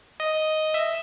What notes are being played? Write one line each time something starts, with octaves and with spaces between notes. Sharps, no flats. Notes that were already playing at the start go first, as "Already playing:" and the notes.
D#5
E5